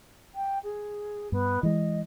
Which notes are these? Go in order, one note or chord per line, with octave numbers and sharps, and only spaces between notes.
G5
G#4
G2 B3
E3 G#3 D#5